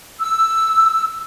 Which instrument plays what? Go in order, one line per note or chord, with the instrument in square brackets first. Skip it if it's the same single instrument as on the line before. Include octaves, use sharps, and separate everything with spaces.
[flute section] E6